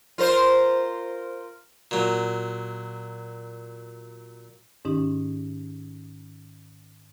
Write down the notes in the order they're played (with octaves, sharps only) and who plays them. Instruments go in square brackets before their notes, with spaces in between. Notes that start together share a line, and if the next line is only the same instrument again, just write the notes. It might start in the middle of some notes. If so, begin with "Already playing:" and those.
[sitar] F4 A#4 C5
[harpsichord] A#2 F#3
[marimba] G#2 D#3 C#4 D#4 G4